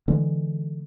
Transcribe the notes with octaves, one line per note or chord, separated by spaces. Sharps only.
D3 E3 G#3